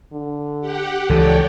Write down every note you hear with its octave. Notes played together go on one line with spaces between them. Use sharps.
D3
G4 F#5
C#2 E3 F3 A4 C#5 D5 G5